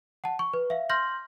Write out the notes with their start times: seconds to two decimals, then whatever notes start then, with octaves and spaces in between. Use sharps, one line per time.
0.24 F#5 A5
0.39 C#6
0.54 B4
0.70 E5 F5
0.89 C6 F6 G6 A#6 F#7